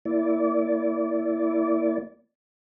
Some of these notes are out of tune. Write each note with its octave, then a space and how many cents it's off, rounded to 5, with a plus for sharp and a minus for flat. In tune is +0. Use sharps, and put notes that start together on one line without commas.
A#3 +0 E4 +0 D5 -25